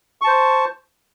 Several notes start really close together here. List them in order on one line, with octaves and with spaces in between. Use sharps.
C#6 A5 C5